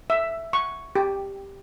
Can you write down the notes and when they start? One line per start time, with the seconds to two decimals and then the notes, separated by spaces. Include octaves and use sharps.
0.10 E5
0.53 C#6
0.96 G4